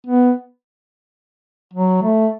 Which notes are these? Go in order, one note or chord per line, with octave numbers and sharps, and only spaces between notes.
B3
F#3
A3